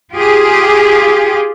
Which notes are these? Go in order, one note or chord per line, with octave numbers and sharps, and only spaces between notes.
F4 G4 G#4